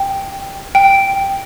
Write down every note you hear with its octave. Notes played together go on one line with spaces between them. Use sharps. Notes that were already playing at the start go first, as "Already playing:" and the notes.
Already playing: G5
G5